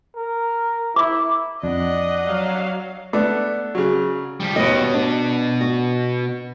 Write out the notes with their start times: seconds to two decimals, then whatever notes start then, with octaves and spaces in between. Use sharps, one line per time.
0.16 A#4
0.96 E4 D6
1.63 F2 D4 D#5 F#5
2.25 F#3 F5
3.13 A3 B3 D4
3.75 C#3 F#3
4.40 F3 G3
4.56 D#2 B2 G3 D#5
4.94 D4
5.61 F#4